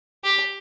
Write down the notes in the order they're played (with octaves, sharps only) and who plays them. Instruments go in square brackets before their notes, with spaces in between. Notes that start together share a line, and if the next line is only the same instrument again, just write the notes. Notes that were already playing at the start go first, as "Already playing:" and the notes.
[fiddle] G4